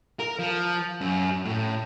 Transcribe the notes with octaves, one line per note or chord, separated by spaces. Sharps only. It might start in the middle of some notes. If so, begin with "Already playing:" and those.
A#4
F3
F#2
A2